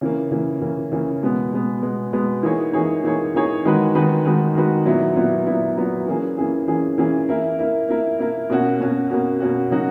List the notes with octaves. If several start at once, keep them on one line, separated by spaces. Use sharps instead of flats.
C#3 E3 A#3
C#3 E3 A#3
C#3 E3 A#3
C#3 E3 A#3
B2 G#3 B3
B2 G#3 B3
B2 G#3 B3
B2 G#3 B3
E3 A#3 D#4 G#4 C#5
E3 A#3 D#4 G#4 C#5
E3 A#3 D#4 G#4 C#5
E3 A#3 D#4 G#4 C#5
D#3 G#3 D#4 F#4 B4
D#3 G#3 D#4 F#4 B4
D#3 G#3 D#4 F#4 B4
D#3 G#3 D#4 F#4 B4
A#2 F#3 B3 E4
A#2 F#3 B3 E4
A#2 F#3 B3 E4
A#2 F#3 B3 E4
E3 A#3 C#4 G#4
E3 A#3 C#4 G#4
E3 A#3 C#4 G#4
E3 A#3 C#4 G#4
A#3 E4 A#4
A#3 E4 A#4
A#3 E4 A#4
A#3 E4 A#4
B2 A#3 C#4 F#4
B2 A#3 C#4 F#4
B2 A#3 C#4 F#4
B2 A#3 C#4 F#4
C#3 F#3 A#3 D#4 F#4